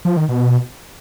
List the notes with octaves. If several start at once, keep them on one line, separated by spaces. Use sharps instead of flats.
F3
D#3
B2